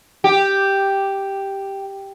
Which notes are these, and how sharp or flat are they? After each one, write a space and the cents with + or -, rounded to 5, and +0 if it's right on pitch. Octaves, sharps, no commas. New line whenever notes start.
G4 +0